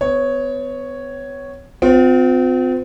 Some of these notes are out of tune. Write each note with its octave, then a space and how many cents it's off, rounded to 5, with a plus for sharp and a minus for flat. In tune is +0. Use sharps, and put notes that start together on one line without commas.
B3 +35 C#5 +0
C4 -35 F4 +30